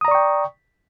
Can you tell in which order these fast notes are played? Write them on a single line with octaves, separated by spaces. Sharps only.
D#6 A#5 D5 C#6 G5